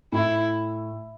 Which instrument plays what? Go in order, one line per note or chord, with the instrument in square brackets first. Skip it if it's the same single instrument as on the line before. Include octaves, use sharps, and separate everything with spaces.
[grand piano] A2 [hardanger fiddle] E4